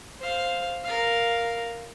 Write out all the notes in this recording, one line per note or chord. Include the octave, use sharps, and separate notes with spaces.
C5 F5
A#4 F5